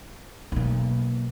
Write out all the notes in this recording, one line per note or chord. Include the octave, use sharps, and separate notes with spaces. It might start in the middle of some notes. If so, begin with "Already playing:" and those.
B1 A#3